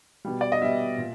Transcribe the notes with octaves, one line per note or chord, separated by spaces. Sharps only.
B2 G3
D5
D#5
B2 G3 E5
A#2